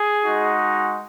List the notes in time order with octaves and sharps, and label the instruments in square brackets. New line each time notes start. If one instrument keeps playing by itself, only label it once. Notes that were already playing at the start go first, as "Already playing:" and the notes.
Already playing: [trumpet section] G#4
G#3 D#4 F#4